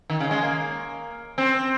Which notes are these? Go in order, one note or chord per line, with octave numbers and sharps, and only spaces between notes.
D#3
C#3
G#3
A#3
C4